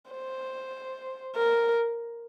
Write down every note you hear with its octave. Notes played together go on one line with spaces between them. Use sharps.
C5
A#4